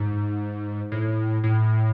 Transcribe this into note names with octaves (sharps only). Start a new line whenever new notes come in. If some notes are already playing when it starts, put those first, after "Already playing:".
Already playing: G#2
A2
A2